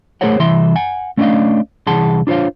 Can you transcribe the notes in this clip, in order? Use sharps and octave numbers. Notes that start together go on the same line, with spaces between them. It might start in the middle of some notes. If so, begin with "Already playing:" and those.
A3 G#4 A#4 C5 C#5 F#5
C2 E3 E5 C6
F#5 G#5
A3 C#4 D4 B4 D#5 F5
C2 E3 G#4 F#5 A5 C6
D4 F4 C5 C#5 F5